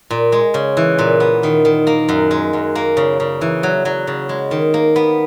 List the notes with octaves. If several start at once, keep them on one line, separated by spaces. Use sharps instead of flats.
A#2
G#3
C#3
E3
A#2
B3
D#3
D#3
A#3
F#2
G#3
F#2
A#3
C#3
C#3
E3
F#3
F#3
C#3
G#3
D#3
A#3
B3